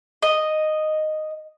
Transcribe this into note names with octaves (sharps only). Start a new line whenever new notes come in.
D#5